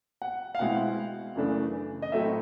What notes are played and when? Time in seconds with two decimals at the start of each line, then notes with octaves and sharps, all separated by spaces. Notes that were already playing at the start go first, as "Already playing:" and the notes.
0.22 F#5
0.55 F5
0.59 B2 G#3 C4 E4 F#5
1.36 F#2 C#3 E3 A3 D4
2.02 D#5
2.12 A2 F#3 A3 C4 E5